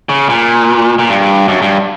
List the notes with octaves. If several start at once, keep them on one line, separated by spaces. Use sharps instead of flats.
C#3
A#2
A#2
G2
F#2
G2